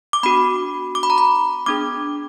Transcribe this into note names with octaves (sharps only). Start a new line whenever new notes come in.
D6
B3 D4 F#4 B5
D6
B5
A#5
B5
B3 D4 G#4 D6